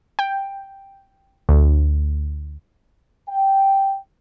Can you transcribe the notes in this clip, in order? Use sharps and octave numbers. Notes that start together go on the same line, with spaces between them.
G5
D2
G5